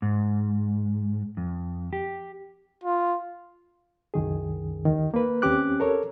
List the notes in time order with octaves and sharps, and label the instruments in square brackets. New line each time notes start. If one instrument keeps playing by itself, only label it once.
[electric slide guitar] G#2
F2
G4
[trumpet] F4
[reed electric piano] C2 F#2 D#3 G#4
D#2 D#3
A#3 B4
D#2 C4 C#4 G4 D6 F#6
A4 A#4 C#5